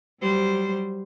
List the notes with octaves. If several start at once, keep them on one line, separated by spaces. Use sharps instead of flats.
F#3 G3 C5